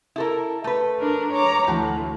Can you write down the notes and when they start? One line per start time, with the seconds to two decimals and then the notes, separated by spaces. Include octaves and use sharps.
0.16 E4 A4 A#4
0.64 A3 B4
1.00 D4 A#4
1.31 C#5 A#5 D6
1.67 D2 A2 E3 F3 F#4